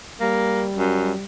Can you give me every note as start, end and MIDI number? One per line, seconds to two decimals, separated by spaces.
0.21 1.24 55
0.21 0.66 58
0.76 1.12 42